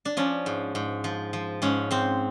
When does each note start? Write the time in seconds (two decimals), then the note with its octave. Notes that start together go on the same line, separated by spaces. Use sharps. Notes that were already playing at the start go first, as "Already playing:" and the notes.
0.05 D4
0.17 F3 C#4
0.46 G#2
0.75 G#2
1.04 F3
1.33 F3
1.62 G#2 C#4
1.91 G#2 C4